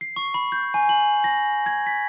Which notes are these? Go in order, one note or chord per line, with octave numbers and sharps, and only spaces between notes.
C7
C#6
B5
G6
G#5
F#7
A#6
G#6
B6